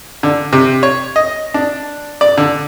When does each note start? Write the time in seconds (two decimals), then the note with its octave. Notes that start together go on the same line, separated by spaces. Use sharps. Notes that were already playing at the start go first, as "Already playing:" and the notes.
0.23 D3
0.53 C3
0.83 C#5
1.16 D#5
1.54 D4
2.21 D5
2.38 D3